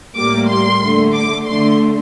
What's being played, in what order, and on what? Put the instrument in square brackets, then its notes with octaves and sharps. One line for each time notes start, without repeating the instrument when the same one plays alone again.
[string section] A2 G3 A#3 D6
C6
D3 A3
D6
D3 A3 C6